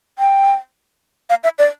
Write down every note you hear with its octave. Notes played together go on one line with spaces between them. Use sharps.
G5
F5
E5
D5